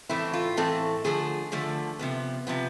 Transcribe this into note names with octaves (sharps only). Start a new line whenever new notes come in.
A2 E3 A3 C4 E4
F4
A2 E3 A3 C4 A4
D3 F3 A3 G#4
D3 F3 A3
C3 F3 B3
C3 F3 B3